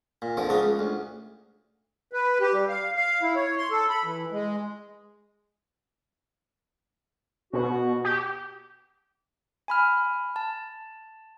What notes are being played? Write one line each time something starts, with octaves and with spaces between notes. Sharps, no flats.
A#2
F2 D3 F3 A#4
C#2 C#3 B3 D4 A#5 D#6
C#2
D2
B4
G4
G3
F5
F5
E4
C#5
C6
A4
B5
E3
G#3
B2 F#4
G4
G#5 B5 F6
A5